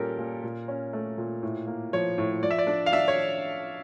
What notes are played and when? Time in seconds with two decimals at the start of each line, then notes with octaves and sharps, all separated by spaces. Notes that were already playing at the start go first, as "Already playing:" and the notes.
Already playing: A#2 G3 C#4 G4 A4 A#4
0.18 A#2
0.44 A#2
0.68 C#4
0.93 A3
1.18 A#2
1.43 A2
1.67 A#3
1.93 F3 C#5
2.18 A2
2.43 F3 D5
2.51 E5
2.59 D5
2.67 D4
2.86 F5
2.92 D4 E5
3.08 C#5